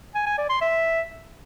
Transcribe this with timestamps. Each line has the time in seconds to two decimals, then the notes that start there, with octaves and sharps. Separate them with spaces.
0.15 G#5
0.26 G#5
0.38 D5
0.50 C6
0.61 E5